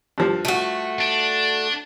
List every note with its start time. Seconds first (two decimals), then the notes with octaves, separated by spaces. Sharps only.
0.18 G2 F3
0.45 A3 F#4
1.00 D4